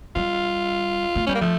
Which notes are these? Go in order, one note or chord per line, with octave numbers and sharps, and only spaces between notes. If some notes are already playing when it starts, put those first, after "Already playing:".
G3 F4
A3
G3 C#4
A#3
F3 A3